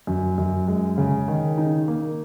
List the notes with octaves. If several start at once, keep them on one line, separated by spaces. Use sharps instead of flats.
F#2
F#2
G#3
C#3
D#3
D#4
A#3